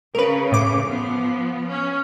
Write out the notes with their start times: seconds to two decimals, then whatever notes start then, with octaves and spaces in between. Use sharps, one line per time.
0.15 C#3 A#4 B4
0.52 A2 D6
0.86 F3 B3
1.68 C#4